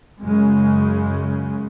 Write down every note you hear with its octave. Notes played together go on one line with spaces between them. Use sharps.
F#2 C#3 G#3